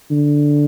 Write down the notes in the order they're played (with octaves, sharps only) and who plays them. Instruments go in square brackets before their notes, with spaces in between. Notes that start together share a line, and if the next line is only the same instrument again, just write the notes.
[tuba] D3